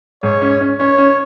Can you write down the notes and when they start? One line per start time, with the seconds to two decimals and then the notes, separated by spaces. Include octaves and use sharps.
0.23 G#2 C#5
0.42 C#4
0.61 C#4
0.80 C#4 C#5
0.98 C#4